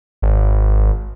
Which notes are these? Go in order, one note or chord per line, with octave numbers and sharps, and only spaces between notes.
G#1